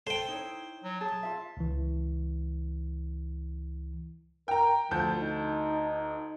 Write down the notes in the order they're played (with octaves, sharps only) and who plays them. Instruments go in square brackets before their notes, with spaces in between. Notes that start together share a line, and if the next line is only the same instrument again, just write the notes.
[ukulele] A4 [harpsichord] C5 G5
[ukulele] D#4 E4 C#5
[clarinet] F#3
[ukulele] G#4 [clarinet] A5
[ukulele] F4 E5
[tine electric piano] C#2 E3
[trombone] A#4 [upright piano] G5 A#5
[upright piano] D2 A5 G6 [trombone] F3
[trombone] D#4